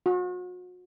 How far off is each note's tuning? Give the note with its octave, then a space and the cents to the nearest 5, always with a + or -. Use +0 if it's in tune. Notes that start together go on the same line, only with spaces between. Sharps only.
F#4 -40